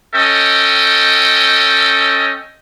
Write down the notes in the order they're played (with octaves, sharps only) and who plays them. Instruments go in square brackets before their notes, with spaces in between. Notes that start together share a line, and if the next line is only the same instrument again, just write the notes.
[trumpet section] C#4 A4 D#5 G5